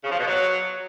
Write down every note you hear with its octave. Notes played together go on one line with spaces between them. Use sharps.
C#3
F3
B2
F#3